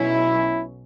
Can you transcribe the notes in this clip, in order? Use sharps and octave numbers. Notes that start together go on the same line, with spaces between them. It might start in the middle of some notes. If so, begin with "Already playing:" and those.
Already playing: B1 B2 F#3 C#4 E4